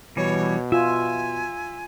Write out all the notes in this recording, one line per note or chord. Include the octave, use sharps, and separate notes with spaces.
B2 E3 G3 C#5
F4 E5 G#5